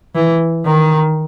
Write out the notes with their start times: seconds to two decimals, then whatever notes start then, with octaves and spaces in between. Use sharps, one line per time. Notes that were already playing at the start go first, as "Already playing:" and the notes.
0.15 E3
0.65 D#3